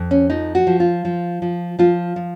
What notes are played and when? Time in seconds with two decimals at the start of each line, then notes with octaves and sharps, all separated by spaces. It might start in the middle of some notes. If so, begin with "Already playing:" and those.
Already playing: F2
0.11 C#4
0.30 F3 D#4
0.55 F#4
0.67 F3
0.80 F4
1.05 F3
1.42 F3
1.79 F3 F4
2.16 F3